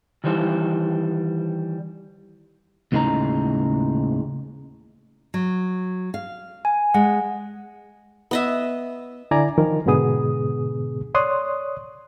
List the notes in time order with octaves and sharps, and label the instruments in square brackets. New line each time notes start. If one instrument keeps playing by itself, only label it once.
[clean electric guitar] D#3 E3 G3 C5
D#2 A2 C#3 G#3 D#4 A#5
[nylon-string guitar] F#3
F5
[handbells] G#5
[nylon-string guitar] G#3 [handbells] F#5
[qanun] B3 D#5 E5
[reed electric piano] D3 E4 D5 G#5 A#5
D#3 F3 A#4
G#2 B2 D3 B3 G#4 D#6
C#5 D5 C6 D#6 F#6